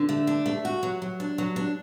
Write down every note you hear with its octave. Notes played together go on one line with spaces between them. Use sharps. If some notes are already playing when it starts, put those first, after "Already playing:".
Already playing: D3
A3
D4
A3
F#4
F#3
F#3
D4
F#3
D4